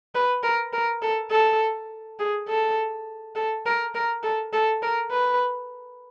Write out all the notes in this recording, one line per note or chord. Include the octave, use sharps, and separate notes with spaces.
B4
A#4
A#4
A4
A4
G#4
A4
A4
A#4
A#4
A4
A4
A#4
B4